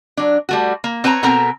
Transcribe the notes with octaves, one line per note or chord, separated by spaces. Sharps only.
F#3 D4
G3 A3 F#4
A#3
C4 B4 C#5 A5 A#5
B2 B3 C4 A4 A#4 A#5